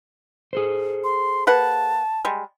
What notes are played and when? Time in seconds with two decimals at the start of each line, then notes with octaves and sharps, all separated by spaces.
0.53 G#4 A4 C5
1.04 C6
1.47 A#3 B4 F#5 A5
2.25 G3 G#3